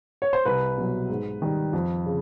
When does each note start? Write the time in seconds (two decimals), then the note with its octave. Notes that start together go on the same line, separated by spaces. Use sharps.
0.22 C#5
0.33 C5
0.45 C2 B4
0.78 B2 F#3
1.09 G#2
1.42 D#3 G3
1.73 F2
2.06 C#3